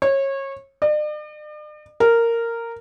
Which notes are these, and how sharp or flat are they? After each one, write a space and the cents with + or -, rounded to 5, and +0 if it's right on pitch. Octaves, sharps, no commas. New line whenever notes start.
C#5 -25
D5 +45
A#4 -10